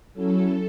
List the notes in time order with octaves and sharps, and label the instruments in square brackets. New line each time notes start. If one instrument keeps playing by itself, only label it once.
[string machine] F#3 C#4 E4 A4